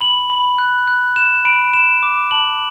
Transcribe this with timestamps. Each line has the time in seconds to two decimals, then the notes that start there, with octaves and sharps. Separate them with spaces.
0.01 B5 F#7
0.30 B5
0.58 F#6
0.88 F#6
1.16 F#6 E7
1.45 B5 D7
1.73 B5 E7
2.03 D6
2.31 A5 F#7